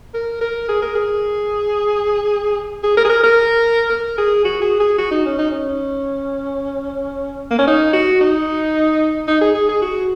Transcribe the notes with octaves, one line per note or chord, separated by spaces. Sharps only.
A#4
A#4
G#4
A#4
G#4
G#4
A#4
G#4
A#4
A#4
A#4
G#4
F#4
G#4
G#4
F#4
D#4
C#4
D#4
C#4
A#3
C#4
D#4
F#4
D#4
D#4
G#4
G#4
G#4
F#4